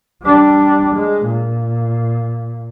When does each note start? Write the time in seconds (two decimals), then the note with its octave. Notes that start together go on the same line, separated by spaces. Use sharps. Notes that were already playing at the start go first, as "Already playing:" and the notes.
0.22 G3 D4
0.95 G#3
1.26 A#2